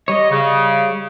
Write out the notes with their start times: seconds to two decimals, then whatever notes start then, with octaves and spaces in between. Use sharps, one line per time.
0.08 G3 C#5 D#5
0.30 C#3